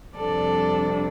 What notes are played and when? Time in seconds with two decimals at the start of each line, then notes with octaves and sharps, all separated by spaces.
0.15 F2 C3 G3 D4 A4 D5